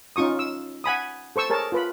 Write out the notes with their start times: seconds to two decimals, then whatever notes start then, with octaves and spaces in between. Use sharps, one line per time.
0.16 C#4 D#4 F4 C#6 D#6
0.39 E6
0.84 F#5 G#5 B5 D#6
1.36 A4 C5 C#6 E6
1.50 G#4 A#4 C#5 A5
1.72 F4 B4 B5